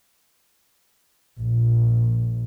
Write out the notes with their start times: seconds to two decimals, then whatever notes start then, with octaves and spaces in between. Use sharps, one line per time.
1.37 A#1